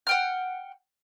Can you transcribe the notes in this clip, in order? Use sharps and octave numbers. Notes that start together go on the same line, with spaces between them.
F#5 G5 F6